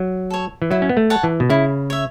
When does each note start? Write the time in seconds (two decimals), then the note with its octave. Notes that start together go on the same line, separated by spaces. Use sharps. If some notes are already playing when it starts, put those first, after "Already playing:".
Already playing: F#3
0.30 A4 C#5
0.62 E3
0.71 F#3 E4
0.82 C#4
0.89 B3
0.97 A3
1.10 C#5 F#5 A5
1.24 E3
1.40 B2
1.50 C#3 E4
1.90 C#5 E5